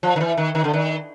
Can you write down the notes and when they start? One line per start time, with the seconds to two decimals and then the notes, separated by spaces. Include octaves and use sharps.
0.03 F3
0.16 D#3
0.20 E3
0.37 D#3
0.55 D#3
0.64 D3
0.74 D#3